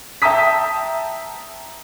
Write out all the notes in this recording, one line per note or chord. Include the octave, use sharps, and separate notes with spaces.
E5 G5 A5 A#5 D#6 B6